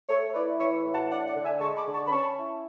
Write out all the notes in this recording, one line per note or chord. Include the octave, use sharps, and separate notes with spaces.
A3 A4 C#5
E4 B4 D5
E3 C#5 E5
A2
F#5 A5
D4 D5 F#5
D5 F#5
D3
E5 G#5
G#3 A5 C#6
B5 D6
D3
A5 C#6
B5
C#4 A5 C#6
E4